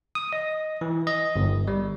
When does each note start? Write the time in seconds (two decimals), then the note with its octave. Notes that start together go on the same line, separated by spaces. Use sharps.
0.15 D#6
0.33 D#5
0.81 E3
1.07 D#5
1.36 G1
1.67 G3